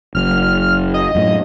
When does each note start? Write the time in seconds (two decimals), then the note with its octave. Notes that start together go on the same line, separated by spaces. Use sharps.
0.15 F#1 F#2 F6
0.94 D#5
1.15 F#2 A2